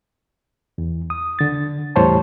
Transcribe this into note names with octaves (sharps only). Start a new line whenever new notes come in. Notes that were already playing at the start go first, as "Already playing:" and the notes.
E2
D#6
D3 A6
E2 A2 G3 C5 C#5 A5